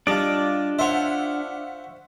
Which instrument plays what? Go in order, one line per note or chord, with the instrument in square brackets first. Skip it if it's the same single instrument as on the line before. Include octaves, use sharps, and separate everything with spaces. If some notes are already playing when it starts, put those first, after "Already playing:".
[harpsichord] G3 [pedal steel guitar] D4 D#5 A5 [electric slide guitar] F4 D5
[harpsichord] C5 C#5 [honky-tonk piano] E5 F#5